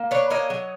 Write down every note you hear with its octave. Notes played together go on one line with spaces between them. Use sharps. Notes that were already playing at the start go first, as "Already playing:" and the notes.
Already playing: A#3
D4 B4 C#5
A#3 C#5 D#5
F#3